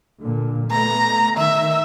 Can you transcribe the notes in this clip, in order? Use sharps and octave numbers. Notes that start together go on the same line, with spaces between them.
A#2 D3
A3 B3 A#5
D#3 E5